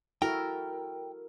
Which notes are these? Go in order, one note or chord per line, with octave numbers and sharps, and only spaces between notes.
E4 F#4 A4 A#4 G5